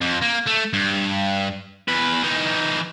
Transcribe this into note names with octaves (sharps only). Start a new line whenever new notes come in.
F2
A#3
A3
G2
E2 B4
E3 D#4